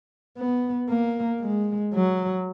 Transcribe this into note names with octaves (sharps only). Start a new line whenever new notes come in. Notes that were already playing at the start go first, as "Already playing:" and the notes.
B3
A#3
G#3
F#3